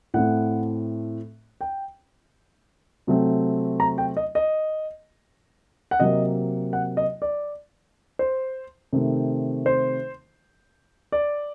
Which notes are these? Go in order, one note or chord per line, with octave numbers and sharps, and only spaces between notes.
A2 A3 C4 F#5
G5
C3 F#3 A3 C4
A#5
G5
D#5
D#5
F#5
C3 F#3 A#3 D#5
F#5
D#5
D5
C5
C3 D#3 A3 C4
C5
D5